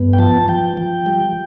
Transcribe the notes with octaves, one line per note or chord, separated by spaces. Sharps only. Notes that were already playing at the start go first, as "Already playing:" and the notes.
Already playing: G2 B3
G5
F3 A5
F3 G5
F3
G3